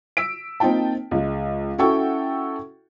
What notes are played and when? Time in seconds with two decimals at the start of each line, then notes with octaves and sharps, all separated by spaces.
0.17 E6 B6 D7
0.60 A#3 C4 D#4 F4 G5 A5
1.11 C#2 G#3
1.78 C#4 E4 F#4 A4 G5 C#6